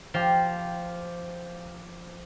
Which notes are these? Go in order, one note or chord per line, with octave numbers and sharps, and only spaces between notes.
F3 G4 F5